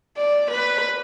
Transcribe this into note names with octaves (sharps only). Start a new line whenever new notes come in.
D5
B4